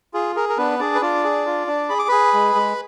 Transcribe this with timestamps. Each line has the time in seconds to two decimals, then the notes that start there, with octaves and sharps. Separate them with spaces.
0.14 F4 G#4
0.36 G#4 A#4
0.49 A#4
0.57 B3 D4 B4
0.79 D4 G#4 D5
0.95 B4
1.02 D4 F4 D5
1.24 G#4
1.46 F4
1.67 D4
1.89 G#4 B5
1.99 D6
2.08 G#4 B4 B5
2.33 G#3
2.55 G#3